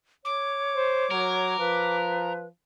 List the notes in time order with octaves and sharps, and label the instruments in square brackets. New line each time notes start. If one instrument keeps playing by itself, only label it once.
[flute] C#5 [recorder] D6
[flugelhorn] C5
[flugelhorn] F#3 [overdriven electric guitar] A#4
[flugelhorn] F3 [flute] B4